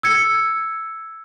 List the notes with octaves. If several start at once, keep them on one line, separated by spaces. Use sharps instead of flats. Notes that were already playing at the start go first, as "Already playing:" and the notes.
E6 G#6 C#7